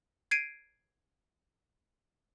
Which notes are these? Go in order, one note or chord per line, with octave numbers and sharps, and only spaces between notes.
G#6 C7 D7 D#7